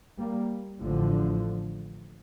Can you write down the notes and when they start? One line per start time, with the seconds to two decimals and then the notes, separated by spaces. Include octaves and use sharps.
0.17 G3 A#3
0.81 A1 A2 D3 F3